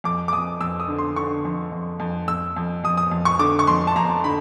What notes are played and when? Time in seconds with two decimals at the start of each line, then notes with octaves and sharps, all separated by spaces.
0.04 F2 D6
0.28 D6
0.33 F2 D#6
0.61 F2 E6
0.80 D#6
0.88 D3
0.98 C6
1.16 D3 C#6
1.45 F2
1.72 F2
2.00 F2
2.28 F2 E6
2.56 F2
2.84 F2 D#6
2.97 D#6
3.11 F2
3.25 C#6
3.39 D3 D6
3.59 C#6
3.67 F2 C6
3.87 A5
3.96 F2 A#5
4.24 D3 B5